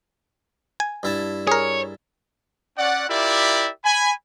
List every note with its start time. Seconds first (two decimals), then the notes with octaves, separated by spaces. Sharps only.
0.80 G#5
1.03 G2 E4 A5
1.47 G#4 A#4 C#5
2.77 C#4 D5 F#5
3.09 E4 F4 G4 A#4 D5 E5
3.84 G#5 B5